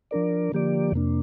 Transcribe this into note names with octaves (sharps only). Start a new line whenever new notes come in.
F3 D4 A#4 D5
D3 F3 A#3 G4 D5
F2 C3 A#3 D4